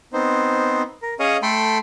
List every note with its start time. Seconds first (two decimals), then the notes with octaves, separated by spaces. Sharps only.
0.13 B3 C4 D#4 C5
1.02 A#4
1.20 C#4 G#4 C#5 D#5 F5
1.42 A3 A4 G5 B5 C6